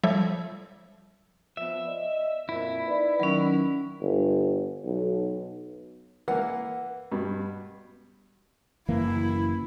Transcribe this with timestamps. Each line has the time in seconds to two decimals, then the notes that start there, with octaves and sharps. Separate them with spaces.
0.04 F3 G3 F4 A4 C#5 E5
1.57 F3 B3 E5
1.87 D5 D#5
2.49 F2 A#2 E4
2.86 D#4 B4 D5
3.20 D#3 F#3 C#4
4.01 G1
4.85 B1
6.28 E3 A#3 F#5
7.12 G2 B2
8.88 F#1 E3 A#3 E4